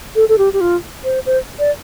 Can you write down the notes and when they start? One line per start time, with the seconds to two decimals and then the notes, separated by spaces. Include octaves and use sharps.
0.16 A4
0.29 A4
0.38 G4
0.53 G4
0.61 F4
1.04 C5
1.26 C5
1.59 D5